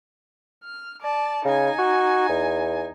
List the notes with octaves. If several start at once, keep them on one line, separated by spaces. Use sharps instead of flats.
F6
D5 A5
C#3 D#4 G#5
F#4
E2